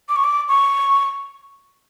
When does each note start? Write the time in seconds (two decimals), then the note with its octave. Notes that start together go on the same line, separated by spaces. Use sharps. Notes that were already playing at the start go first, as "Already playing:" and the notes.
0.09 D6
0.16 C#6
0.24 D6
0.48 C#6